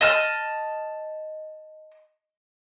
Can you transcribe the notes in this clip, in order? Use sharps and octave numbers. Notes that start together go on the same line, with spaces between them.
D#5 A5 F6